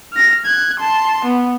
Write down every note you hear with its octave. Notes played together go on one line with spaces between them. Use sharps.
F6 A#6
F#6 G#6
A5 C6
B3